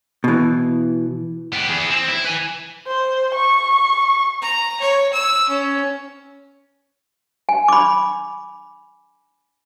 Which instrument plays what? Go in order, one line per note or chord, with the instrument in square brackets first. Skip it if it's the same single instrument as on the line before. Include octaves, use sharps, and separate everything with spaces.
[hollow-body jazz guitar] B2 E3
[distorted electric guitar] B3 G4
E3 G#4
C4
E4
B4 G#5
[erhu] C5
C#6
[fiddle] A#5
C#5
E6
C#4
[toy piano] G#5
B5 D6